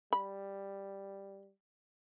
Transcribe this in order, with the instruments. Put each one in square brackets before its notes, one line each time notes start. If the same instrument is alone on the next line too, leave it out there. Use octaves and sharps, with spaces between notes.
[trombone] G3 [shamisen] B5